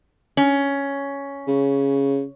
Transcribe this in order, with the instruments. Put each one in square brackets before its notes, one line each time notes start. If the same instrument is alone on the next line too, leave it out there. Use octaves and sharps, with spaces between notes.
[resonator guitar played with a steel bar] C#4
[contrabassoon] C#3